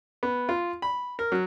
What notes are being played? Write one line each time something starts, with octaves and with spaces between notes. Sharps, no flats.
B3
F4
B5
A#4
F#3